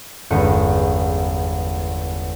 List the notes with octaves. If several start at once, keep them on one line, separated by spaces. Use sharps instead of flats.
G1 E2 G#3 C#4 G6 C#7